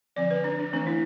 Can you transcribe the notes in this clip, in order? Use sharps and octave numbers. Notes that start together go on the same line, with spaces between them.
D3 F3 C4 D5
B4
D4
D4
E3 A3 C4 D4
E4